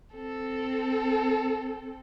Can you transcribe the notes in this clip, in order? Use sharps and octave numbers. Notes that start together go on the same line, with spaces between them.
C4 A4